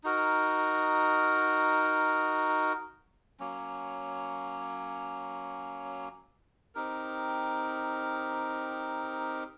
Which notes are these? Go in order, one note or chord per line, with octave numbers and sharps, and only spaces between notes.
D#4 F#4 A#4
F#3 A#3 C#4
C4 D#4 G4 A#4